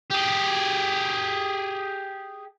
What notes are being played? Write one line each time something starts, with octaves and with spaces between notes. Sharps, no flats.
G4 G#4